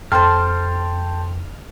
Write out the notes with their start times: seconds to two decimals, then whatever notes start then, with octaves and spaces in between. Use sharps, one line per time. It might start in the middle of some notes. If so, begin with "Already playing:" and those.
0.12 F2 A4 C5 G5 A5 C6 F6